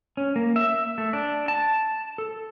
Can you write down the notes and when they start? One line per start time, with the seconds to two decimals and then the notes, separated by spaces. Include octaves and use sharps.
0.17 C#4
0.36 A#3
0.56 E5
0.98 A3
1.13 D4
1.48 A5
2.18 A4